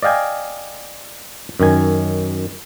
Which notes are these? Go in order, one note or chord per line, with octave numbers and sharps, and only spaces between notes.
D5 D#5 F5 G5 G#5
F#2 D#3 G#5